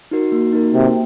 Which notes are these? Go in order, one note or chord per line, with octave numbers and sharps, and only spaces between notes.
D#4 F#4 A#4
A#3
D#4 F#4 A#4
C3 A#3